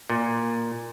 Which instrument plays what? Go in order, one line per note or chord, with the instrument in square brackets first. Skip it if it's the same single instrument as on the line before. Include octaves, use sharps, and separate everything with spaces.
[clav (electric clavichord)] A#2